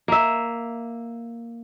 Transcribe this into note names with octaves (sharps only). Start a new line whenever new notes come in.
A#3 E5